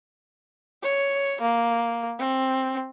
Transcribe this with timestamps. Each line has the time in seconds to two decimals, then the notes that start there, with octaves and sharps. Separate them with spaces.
0.83 C#5
1.41 A#3
2.19 C4